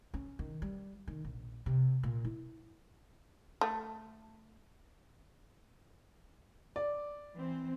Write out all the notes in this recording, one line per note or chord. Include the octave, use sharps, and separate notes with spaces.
C#4
D#3
G3
D#3
A#1
C3
A#2
E4
A3
D5
E3 C4